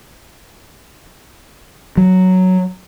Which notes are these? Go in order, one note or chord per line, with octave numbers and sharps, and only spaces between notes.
F#3